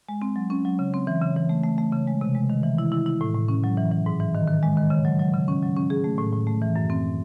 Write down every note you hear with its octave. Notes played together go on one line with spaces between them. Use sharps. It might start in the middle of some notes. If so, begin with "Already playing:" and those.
G#3
C4
F#3
C#4
F#3
C#3
C4
E3
C#3
E3
A3
A3
A3
C#3
G#3
C3
G#3
D#3
E3
E4
E4
E4
A2
A2
C#4
F#3
E3
E3
G#2
E3
D#3
D#3
G#3
D#3
C#3
F#3
F#3
C#3
C#4
F#3
C#4
G#4
A3
A2
A2
A3
E3
F#2
C4